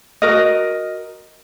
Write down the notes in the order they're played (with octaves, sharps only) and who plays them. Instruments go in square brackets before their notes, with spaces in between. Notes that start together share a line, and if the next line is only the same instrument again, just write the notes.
[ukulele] F#4 A#4 D#5